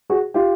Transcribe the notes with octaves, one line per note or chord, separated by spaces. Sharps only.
F#4 G#4
F4 G4